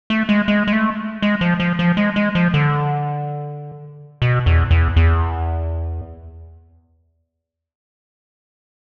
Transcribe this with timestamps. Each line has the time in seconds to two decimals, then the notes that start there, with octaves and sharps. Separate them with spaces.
0.10 A3
0.29 G#3
0.48 G#3
0.67 G#3
0.73 A3
1.22 G#3
1.41 F3
1.60 F3
1.79 F3
1.97 G#3
2.16 G#3
2.35 F3
2.54 D3
4.22 B2
4.46 E2
4.71 E2
4.96 E2